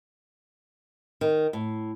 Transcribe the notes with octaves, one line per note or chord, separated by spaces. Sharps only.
D#3
A2